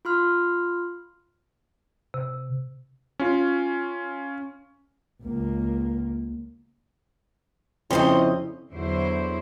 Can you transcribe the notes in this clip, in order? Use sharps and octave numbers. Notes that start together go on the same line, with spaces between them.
F4 C6 F6
C3
C#4 F4
C#2 A#3
F2 C#3 C4 C#4 E4 C5 D#5
E2 D3 F#3 E4 C5